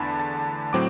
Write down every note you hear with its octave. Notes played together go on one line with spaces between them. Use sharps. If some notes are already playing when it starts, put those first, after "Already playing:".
Already playing: E2 D3 A3 A5 B5
A5
A2 F#3 C4 D6